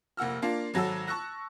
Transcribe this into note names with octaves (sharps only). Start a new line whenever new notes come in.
F1 A#3 F#5 E6 F6
A#3 D4 F4
G#1 F#3 F#4 A4 E6
A5 C#6 E6 F#6 A#6